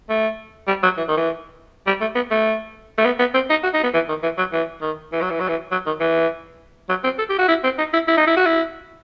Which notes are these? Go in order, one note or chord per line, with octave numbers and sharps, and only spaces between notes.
A3
G3
F#3
E3
D#3
E3
G3
A3
B3
A3
A3
B3
B3
C4
D#4
F#4
D#4
B3
E3
D#3
E3
F#3
E3
D#3
E3
F#3
E3
F#3
E3
F#3
D#3
E3
F#3
C4
A4
G4
F#4
E4
C4
D#4
E4
E4
D#4
E4
F#4
E4